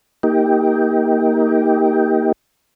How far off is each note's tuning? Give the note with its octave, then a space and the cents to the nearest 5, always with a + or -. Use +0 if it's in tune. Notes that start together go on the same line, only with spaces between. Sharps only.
A#3 +0 D#4 +30 G4 +0